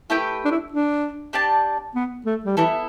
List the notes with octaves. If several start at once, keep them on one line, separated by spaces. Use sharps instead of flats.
A3 E4 G4 B4 G5
D4
E4
D4
D4 G4 D5 A5
B3
A3
G3
E3 B3 E4 A4